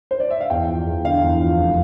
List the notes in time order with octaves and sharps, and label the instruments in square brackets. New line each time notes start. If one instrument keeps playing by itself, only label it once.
[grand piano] C5
D5
E5
F5
E2 G5
F3
E2
D3 F5
E2
F3
F1